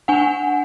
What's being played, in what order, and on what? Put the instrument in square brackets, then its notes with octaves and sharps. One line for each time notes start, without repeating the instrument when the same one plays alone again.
[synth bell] D4 F#5 G#5